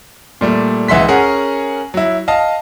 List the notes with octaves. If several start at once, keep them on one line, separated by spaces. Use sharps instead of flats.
A#2 G3 A3
C#2 E3 E5 F#5 C6 B6
C#4 G#4 A#4 F#5
F#3 E4
D#5 F5 A5